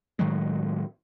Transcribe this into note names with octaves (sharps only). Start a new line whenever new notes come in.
A2 D#3 F#3 G#3